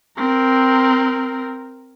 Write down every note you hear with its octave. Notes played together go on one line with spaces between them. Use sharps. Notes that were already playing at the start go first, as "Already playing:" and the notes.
C4 A#4